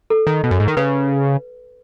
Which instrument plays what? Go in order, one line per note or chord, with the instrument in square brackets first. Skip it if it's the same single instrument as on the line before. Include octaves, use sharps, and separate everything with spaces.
[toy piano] A4
[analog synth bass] D#3
B2
F#2
G#2
D#3
[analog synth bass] C#3 [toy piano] B4